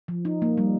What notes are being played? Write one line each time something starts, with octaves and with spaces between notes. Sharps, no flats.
F3
D#4
A#3
G3